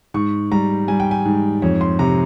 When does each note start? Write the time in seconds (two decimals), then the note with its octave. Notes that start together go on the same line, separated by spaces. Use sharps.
0.14 G#2 C#6
0.52 G3 A#5
0.88 G3 G#5
1.00 G5
1.11 G#5
1.25 G#2
1.62 F2 C#5
1.81 C6
1.99 C3 A#5